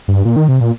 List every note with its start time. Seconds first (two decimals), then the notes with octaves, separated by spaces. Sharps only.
0.08 G2
0.25 A#2
0.36 D#3
0.48 C3
0.61 A#2